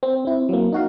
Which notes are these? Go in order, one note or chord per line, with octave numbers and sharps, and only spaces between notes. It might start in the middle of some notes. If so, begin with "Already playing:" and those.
C4
C4 E4
F#3 A#3
D#4 F#4 F5